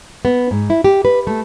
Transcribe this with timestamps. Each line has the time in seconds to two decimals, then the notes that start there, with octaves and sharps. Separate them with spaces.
0.25 B3
0.51 G#2
0.70 E4
0.84 G4
1.05 B4
1.27 A3